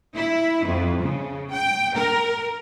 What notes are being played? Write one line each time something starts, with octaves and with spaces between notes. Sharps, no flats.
E4
F2
C#3
G5
A#4